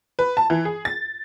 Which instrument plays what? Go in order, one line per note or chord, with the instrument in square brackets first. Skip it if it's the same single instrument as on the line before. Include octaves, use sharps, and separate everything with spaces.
[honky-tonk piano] B4
A5
E3
G#4
A6